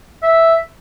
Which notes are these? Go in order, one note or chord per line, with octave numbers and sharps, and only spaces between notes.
E5